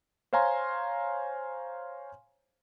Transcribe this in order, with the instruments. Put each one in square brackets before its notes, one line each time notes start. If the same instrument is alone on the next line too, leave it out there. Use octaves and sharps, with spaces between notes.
[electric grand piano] C5 C#5 F5 G#5 A#5 C6